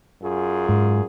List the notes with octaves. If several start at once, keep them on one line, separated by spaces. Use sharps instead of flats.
F#2 F4 G#4
G#2